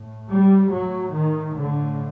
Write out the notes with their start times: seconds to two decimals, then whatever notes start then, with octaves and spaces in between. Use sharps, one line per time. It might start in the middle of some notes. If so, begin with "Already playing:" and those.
Already playing: A2
0.30 G3
0.71 A2 F#3
1.13 D#3
1.56 A2 D3